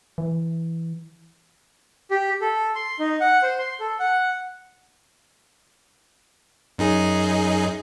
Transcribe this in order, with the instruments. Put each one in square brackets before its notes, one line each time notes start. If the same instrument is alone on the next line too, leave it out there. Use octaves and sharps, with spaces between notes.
[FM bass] E3
[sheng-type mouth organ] G4
A4
C6
D#4
F#5
C5
C6
A4
F#5
[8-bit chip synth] F#2 D#4 G#4